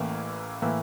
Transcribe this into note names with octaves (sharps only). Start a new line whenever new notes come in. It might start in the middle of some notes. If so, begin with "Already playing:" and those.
Already playing: A1 A2 E3 A#3 E4
A2 E3 A#3 E4